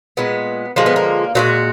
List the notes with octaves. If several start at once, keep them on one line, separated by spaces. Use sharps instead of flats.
A#2 G#3 B3
D3 F3 G#3 A#3
B3
A#3
A#2 F3 G#3 F#4